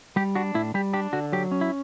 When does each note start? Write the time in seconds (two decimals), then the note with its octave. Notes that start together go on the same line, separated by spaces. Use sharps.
0.16 G3 G4
0.35 D4 F#4
0.55 A2 E4
0.74 G3 G4
0.93 D4 G4
1.13 D3 F#4
1.33 F#3 G4
1.52 C#4
1.61 E4